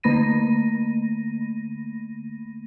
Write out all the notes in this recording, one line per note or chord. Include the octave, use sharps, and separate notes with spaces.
D3 A3 A#3 B5 A#6 D#7